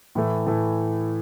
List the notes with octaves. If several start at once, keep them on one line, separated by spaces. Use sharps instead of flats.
A2 E3 A3
A2 E3 A3